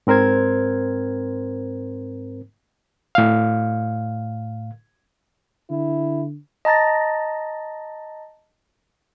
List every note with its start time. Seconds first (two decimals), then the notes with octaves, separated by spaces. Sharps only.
0.07 G#2 C4 A#4 C5 G#6
3.15 A2 F5
5.71 D3 E4
6.65 D#5 A5 A#5 A6 A#6